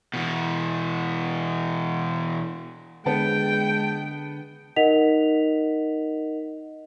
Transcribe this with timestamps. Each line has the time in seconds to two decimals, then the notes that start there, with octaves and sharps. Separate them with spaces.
0.14 B2 E3
3.06 D3 G#3 B3 G5 A5
4.76 D#4 A#4 D#5 F#5 B6 F7